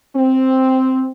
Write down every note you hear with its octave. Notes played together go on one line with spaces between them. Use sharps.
C4